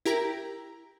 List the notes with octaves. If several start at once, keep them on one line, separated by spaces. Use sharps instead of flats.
E4 G4 A#4 A#5